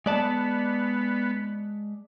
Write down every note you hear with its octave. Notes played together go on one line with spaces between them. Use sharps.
G#3 B3 D5 A5